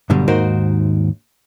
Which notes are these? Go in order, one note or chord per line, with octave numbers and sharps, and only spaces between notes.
G2 B2 D3 F#3 G3
D#2 G#2 D#4 F#4 A#4 C5